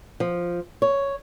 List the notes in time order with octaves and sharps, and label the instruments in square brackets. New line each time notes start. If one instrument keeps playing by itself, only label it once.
[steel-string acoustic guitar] F3
C#5